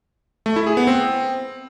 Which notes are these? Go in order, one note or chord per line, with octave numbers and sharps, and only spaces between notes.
A3
E4
G#4
B3
C4